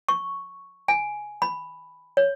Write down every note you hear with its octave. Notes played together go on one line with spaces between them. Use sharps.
C#6
G#5
B5
C#5